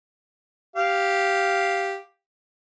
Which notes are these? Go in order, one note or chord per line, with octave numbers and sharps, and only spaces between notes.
G4 F5